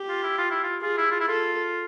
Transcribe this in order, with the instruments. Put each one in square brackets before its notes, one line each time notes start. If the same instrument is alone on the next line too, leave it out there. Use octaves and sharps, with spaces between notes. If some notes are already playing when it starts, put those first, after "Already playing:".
Already playing: [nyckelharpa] G4
[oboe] F4
E4
F4
E4
F4
[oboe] F4 [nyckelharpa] G#4
[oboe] E4
F4
E4
[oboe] F4 [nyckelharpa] A4